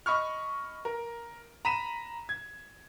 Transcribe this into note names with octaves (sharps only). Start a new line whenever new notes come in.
D#5 B5 C#6 F6
A#4
A#5 B5 B6 D#7 E7
G#6